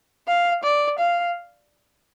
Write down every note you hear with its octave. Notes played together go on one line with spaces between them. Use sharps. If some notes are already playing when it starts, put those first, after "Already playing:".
F5
D5
F5